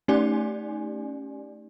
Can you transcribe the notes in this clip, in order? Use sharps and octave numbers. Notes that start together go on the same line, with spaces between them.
A3 C#4 D#4 G4 D5 G#5